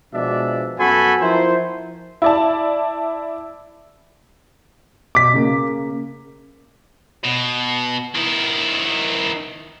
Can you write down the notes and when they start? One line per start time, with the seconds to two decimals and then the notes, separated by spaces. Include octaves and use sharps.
0.13 B2 F3 G#3 D4 D5 E5
0.78 F#2 B3 F#4 A4 G#5 B5
1.20 F3 E4 A#4 C5
2.22 E4 D5 A5
5.15 B2 D6 B6
5.34 C#3 A#3
7.24 B2
8.15 D#3 E4